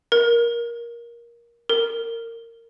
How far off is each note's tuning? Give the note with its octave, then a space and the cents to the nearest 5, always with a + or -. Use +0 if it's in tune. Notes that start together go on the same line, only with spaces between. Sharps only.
A#4 +15
A#4 -20